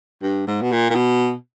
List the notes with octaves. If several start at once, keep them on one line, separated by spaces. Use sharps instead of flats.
G2
G#2
B2
A#2
A#2
B2